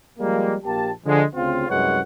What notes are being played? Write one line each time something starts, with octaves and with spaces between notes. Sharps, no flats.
F3 G3 G#3 A#3
A#1 A#3 G4 A5
D3 F3 G#3
D2 C#3 C4 F4
C2 F#2 G#3 B4 C#5 F#5